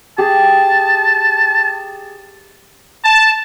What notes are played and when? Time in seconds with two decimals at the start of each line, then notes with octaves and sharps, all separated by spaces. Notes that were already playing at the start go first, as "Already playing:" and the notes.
0.18 G4 G#4 A5
3.05 A5